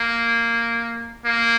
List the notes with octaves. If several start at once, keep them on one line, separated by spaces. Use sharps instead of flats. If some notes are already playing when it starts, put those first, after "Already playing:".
Already playing: A#3
A#3